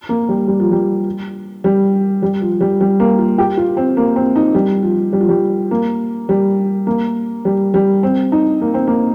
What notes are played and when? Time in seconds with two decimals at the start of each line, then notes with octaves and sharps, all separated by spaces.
0.09 A#3
0.29 G3
0.48 G3
0.60 F3
0.71 G3
1.64 G3
2.22 G3
2.41 F3
2.60 G3
2.80 G3
3.00 A#3
3.18 F4
3.38 G4
3.57 F4
3.77 C4
3.97 A#3
4.16 C4
4.36 D#4
4.54 G3
4.83 F3
5.13 G3
5.21 F3
5.29 G3
5.71 A#3
6.29 G3
6.87 A#3
7.45 G3
7.74 G3
8.03 C4
8.32 D#4
8.61 A#3
8.74 C4
8.87 A#3